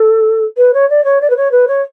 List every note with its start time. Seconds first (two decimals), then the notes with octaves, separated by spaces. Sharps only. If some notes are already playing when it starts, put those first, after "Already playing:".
Already playing: A4
0.57 B4
0.73 C#5
0.89 D5
1.04 C#5
1.21 D5
1.30 B4
1.36 C#5
1.51 B4
1.67 C#5